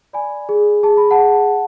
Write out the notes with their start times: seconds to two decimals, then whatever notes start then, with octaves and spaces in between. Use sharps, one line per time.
0.13 D5 G#5 B5
0.49 G#4
0.83 G#4 A5
0.97 B5
1.11 F#5 A5
1.19 G#4